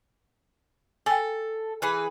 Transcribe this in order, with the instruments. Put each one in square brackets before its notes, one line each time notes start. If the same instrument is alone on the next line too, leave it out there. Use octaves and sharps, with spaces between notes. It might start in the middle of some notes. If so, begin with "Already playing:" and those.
[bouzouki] A4 [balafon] G5 G#5
[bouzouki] E3 G#4 B4